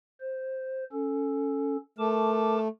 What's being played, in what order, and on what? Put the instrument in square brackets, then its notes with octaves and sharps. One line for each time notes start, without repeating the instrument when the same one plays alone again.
[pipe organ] C5
C#4 A4
[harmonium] A3 [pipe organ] A#4 A5 D6